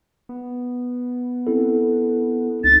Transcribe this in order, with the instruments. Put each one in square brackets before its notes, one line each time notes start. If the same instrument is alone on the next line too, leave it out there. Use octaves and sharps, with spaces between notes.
[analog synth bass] B3
[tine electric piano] C4 E4 A4
[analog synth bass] C#2 [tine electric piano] D#4 [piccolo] A6